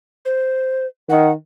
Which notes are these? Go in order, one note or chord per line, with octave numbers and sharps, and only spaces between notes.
C5
D#3 F#5